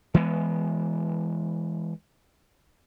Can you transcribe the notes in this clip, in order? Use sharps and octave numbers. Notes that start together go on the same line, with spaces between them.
E3 G#3 B3